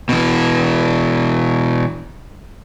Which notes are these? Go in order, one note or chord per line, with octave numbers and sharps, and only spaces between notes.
B2 E3